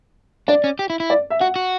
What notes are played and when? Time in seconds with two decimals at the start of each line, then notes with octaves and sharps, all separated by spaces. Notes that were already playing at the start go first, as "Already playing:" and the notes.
0.48 D4 D5
0.64 C#4
0.79 G4
0.90 E4
1.00 E4
1.10 D5
1.30 E5
1.40 F#4 F#5
1.56 F#4